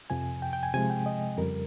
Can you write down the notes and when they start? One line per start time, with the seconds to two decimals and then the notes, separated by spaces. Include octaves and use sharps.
0.10 F2 C3 F3 G#5
0.42 G5
0.53 G5
0.63 G#5
0.74 C3 F3 G#3 G#5
0.90 G5
1.06 D#5
1.37 F2 C#3 G3 A#4